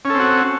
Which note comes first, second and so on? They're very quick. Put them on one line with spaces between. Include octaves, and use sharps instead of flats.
C#4 A4 C4 F#4